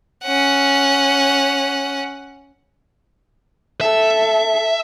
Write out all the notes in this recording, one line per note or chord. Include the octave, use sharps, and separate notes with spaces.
C#4 F#5
A4 E5